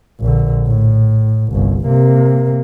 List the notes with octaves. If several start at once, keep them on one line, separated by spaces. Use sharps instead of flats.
A#1 D3
A2
G1 C2
C3 A#3